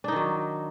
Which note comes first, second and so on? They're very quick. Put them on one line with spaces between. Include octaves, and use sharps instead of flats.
D4 D#4 D#3 F#3